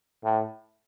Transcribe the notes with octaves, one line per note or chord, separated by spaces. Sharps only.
A2